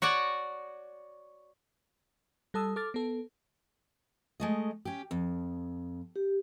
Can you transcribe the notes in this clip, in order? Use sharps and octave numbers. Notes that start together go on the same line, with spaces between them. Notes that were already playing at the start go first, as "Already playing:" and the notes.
F#4 C#5 D5 F#5
G3 A4 A5 D#6 E6
A4 D6 F6 A6
B3 A4
G#3 A3 D#5
C#4 G4
F2
G4